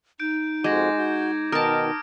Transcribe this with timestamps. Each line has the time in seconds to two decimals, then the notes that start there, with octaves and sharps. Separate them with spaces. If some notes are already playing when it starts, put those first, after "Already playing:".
0.20 D#4 G6 D7
0.64 F2 G#3 F#4 D6 G#6 A#6
0.99 F#4 G6
1.52 B2 D#3 A#4 A5 D#6 F6 D7